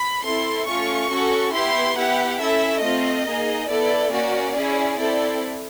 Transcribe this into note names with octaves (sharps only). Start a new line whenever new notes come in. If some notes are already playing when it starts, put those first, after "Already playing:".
Already playing: B5
C4 E4 A4 C6
A3 C#4 F4 C#6
C#4 F#4 A4
B3 E4 G4 C6
B3 E4 G4 F#5
C#4 E4 A4 E5
A3 C4 F4 D#5
A#3 D#4 G#4
B3 E4 A4 D5
A#3 C#4 F#4 D5
C#4 E4 G#4
C4 E4 A4 D5